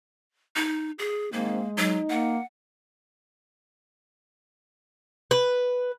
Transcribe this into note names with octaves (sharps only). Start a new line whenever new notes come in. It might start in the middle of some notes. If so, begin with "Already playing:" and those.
D#4
G#4
G#2 D#3 G#3 A#3 C4
F#3 D#4
A#3 F#5
B4